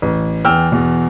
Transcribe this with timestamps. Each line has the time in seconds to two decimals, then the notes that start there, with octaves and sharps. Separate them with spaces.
0.02 A1
0.45 E2 G5 E6 F6
0.72 E2 B2